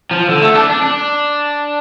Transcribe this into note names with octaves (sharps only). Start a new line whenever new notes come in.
F3
D3
A3
D4
D4
D4